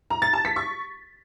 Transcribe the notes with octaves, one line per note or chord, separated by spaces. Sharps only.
A#5
A6
A5
B6
C#6